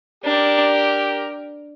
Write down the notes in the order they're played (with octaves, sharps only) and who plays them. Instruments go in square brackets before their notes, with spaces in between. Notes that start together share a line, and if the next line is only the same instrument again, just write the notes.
[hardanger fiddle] D4 [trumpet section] G4 A#4